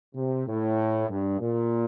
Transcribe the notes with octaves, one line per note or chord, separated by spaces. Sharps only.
C3
A2
G2
A#2